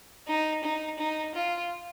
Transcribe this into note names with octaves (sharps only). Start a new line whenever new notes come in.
D#4
D#4
D#4
F4